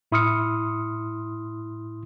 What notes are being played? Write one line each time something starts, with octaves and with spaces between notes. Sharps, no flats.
A2 E4 C6 D#6 F6 C#7